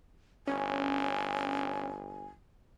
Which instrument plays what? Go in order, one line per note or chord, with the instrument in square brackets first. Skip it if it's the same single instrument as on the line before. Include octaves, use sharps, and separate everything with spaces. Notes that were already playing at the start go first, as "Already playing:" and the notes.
[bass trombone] G1 [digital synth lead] C#4 [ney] G#5